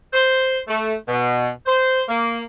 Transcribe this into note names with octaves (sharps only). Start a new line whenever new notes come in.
C5
A3
B2
C5
A#3